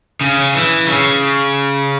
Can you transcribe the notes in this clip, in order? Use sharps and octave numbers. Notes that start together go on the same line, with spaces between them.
C#3
E3
C#3